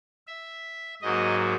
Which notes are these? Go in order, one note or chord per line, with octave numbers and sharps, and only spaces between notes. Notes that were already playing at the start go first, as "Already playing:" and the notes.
E5
G#2 F#3 A#3 D#5